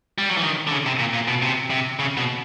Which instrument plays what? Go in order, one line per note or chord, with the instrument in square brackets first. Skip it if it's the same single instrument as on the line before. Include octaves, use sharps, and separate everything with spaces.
[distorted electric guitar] G3
F#3
E3
D#3
D3
C#3
C3
A#2
A#2
B2
C3
C3
C#3
B2